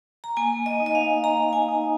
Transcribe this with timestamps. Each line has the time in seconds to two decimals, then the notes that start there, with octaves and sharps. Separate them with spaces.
0.24 A#5
0.37 A#3 G#5
0.66 D#5
0.80 D#4
0.86 D#5
0.95 F5
1.24 A#3 A#5
1.53 G#5
1.68 D#4